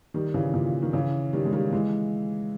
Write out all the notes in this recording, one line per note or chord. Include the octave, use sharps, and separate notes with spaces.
D#3 G3
C#3 E3
A#2 C#3
D#3
C#3 E3
D#3 G3
G#3
D#3 G3
E3 G#3